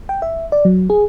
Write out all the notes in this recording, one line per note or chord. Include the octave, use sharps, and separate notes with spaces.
G5
E5
D5
F#3
G#4